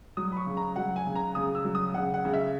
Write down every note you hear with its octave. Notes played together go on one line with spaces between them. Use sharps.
F#3 D#6
B5
C#6
C#3
A#5
F#3 F#5
G#5
C#3
A#5
C#3 D#6
E6
F#3
D#6
C#3 F#5
F#5
C#3
E5